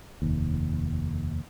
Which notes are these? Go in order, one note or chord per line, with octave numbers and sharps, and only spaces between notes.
F1 D#2